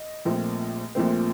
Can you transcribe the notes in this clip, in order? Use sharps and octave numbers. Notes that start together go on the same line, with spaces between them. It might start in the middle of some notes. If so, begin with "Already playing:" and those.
Already playing: D#5
A#1 A#2 A3 C4
A#1 A#2 A3 C4